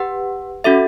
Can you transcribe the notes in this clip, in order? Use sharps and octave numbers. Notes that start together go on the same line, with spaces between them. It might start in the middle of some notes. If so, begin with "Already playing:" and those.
Already playing: G4 B4 F#5
C#4 F#4 A4 E5